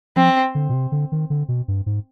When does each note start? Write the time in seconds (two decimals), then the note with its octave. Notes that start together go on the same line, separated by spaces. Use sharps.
0.16 F3 C4
0.55 D3
0.69 B2
0.74 C3
0.92 D3
1.12 D#3
1.30 D3
1.48 B2
1.68 G2
1.86 G#2